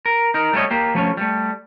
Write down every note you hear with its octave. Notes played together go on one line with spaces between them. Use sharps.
A#4
D#4 A#4
G3 A3 A#4 C#5 D#5
A#3 G4
F3 A3 C#4
G3 A3